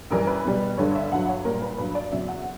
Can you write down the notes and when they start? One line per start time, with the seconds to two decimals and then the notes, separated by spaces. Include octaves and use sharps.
0.10 F#2 E3 G3 A#4
0.27 B4
0.45 B2 G3
0.77 G2 D3 G3 C#5
0.95 E5
1.12 G2 F#3 F#5
1.29 C#5
1.45 A#2 G3 A#4
1.62 B4
1.78 G2 F#3 B4
1.95 D5
2.12 E2 C#3 F#3 E5
2.28 F#5